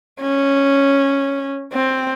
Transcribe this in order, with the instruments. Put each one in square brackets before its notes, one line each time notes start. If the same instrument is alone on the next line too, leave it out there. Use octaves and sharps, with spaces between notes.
[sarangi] C#4
C4